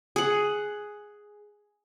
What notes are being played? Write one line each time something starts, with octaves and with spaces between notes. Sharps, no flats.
G#4 F#5